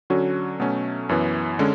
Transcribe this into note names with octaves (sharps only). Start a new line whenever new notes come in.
D3 F#3 C#4 F#4
B2 F#3 A3 C#4
F#2 E3 B3
D3 G#3 C#4